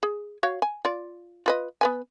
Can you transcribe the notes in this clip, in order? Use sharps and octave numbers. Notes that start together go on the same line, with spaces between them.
G#4
F#4 C#5 F5
G#5
F4 D5
F4 B4 D#5
B3 B4 G#5